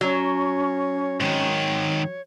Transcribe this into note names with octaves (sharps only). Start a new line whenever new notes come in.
F#3 C#4 C#5
G#2 D#3 C#5